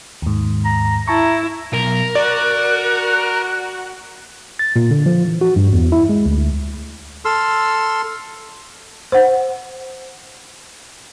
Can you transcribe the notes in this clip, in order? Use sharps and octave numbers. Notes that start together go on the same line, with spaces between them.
D#2 G#2
A#5
E4 A5 A#5 C#6
B1 A#4
F#4 D5 F#6
A6
A#2
D3
F3
E3
F#4
G2
E2
E4
G#3
D2
A4 C6 E6 F6
C5 F#5